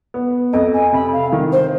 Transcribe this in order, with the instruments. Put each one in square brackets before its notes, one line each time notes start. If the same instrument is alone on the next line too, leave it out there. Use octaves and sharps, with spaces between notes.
[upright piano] B3
[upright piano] F2 [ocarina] D#5
[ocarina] G#5
[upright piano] C3 [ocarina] B5
[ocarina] F5
[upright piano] D#3
[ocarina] C5